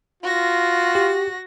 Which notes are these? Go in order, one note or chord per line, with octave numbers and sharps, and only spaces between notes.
F4 F#4 A#6
G4